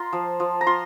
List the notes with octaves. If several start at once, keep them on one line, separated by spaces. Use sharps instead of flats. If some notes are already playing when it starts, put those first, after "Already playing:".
Already playing: F4 A#5 C6
F3
F3
A#5
F4 C6